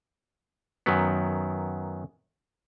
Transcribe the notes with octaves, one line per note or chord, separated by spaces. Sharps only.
F#2 D#3 F#3 B3